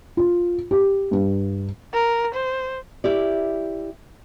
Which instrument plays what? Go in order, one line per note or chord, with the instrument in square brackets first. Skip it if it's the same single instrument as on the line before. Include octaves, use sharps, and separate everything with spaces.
[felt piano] F4
G4
G2
[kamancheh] A#4
C5
[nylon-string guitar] E4 G4 D5